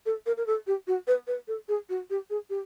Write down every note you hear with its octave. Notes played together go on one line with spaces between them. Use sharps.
A4
A#4
A#4
A4
G4
F#4
B4
B4
A4
G#4
F#4
G4
G#4
G4